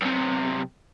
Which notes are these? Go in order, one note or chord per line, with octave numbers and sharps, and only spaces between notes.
B1 C3